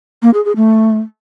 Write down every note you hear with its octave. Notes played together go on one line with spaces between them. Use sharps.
A#3
G#4
G#4
A3